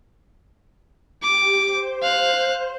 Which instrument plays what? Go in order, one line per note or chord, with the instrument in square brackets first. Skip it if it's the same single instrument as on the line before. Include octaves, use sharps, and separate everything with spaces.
[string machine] G4 [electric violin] D6
[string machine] C5
[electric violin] F5 F#6